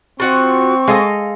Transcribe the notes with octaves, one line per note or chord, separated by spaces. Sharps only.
C4 F4 F#4 F#5 C#6
G#3 A4 D#5 F5